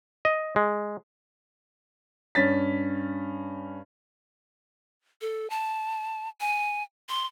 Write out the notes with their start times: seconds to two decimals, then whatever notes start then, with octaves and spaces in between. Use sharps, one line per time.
0.25 D#5
0.56 G#3
2.35 G2 C#4 A6 B6
5.21 A4
5.50 A5
6.41 G#5
7.09 C6